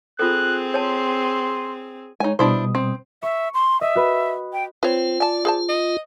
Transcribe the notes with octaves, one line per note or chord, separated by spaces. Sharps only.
C4 F4 G#4 A4 F#6
C#5 A5 C6
G#3 D#4 C#5 G#5
B2 G3 D4 E4 C5 D#6
C4
E5 C#6
C6
D#5 E5
F#4 B4
G5
C4 F4 B4 C#5
D5 G#5 A5
G#4 C5 A5
D#5